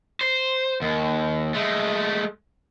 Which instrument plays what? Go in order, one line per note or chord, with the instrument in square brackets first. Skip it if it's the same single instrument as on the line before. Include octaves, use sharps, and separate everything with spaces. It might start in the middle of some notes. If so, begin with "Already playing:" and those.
[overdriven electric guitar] C5
D#2
G#3 A3